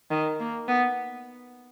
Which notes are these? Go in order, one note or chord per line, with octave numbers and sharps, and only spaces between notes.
D#3
A#3
B3